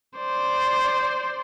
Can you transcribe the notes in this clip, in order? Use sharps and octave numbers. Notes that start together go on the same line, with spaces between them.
C5 D5